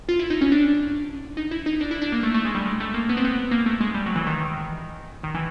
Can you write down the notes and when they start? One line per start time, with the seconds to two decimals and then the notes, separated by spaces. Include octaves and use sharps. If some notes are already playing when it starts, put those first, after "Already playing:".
0.09 F4
0.19 E4
0.30 D#4
0.41 C#4
0.52 D4
1.37 D#4
1.51 E4
1.66 D#4
1.81 D4
1.91 E4
2.01 D4
2.12 A#3
2.23 A3
2.34 A3
2.45 G#3
2.55 G3
2.66 G#3
2.80 A3
2.94 A#3
3.09 B3
3.17 C4
3.25 B3
3.51 A#3
3.66 A3
3.81 G#3
3.94 G3
4.06 F#3
4.16 E3
4.27 D#3
5.24 D#3
5.35 E3